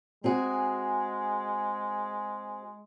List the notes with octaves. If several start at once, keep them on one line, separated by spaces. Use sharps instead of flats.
G#3 C4 F#4 G#4